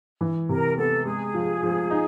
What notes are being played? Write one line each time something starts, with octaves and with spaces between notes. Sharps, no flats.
E3
C3 A#4
B3 A4
G#3 G#4
F3
F3
D#4